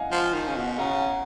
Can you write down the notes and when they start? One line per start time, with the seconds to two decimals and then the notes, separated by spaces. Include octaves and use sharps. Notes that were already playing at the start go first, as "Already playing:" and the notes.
Already playing: D#5 F5 F#5 G#5
0.11 F3
0.34 D#3
0.47 C#3
0.56 B2
0.79 C#3 F#5 A#5